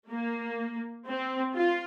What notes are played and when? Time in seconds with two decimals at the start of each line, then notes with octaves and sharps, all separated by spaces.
0.09 A#3
1.07 C4
1.56 F4